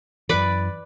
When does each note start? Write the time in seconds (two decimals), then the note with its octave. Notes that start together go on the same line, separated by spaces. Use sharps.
0.29 F#2 E3 B4 D5 B5